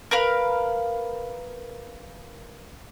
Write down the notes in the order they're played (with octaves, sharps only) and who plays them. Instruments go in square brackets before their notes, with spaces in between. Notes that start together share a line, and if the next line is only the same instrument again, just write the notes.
[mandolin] A#4 B4 F5